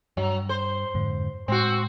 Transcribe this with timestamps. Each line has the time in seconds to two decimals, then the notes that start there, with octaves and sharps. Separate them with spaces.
0.17 G2 F#3
0.49 C5
0.94 F2 G#2 D3
1.48 A2 G#3 C4 F#4